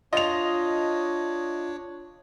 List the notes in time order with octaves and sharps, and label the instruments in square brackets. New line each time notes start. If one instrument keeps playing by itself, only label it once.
[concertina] D4 C#5 [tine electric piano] F4 [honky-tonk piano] D#5 F7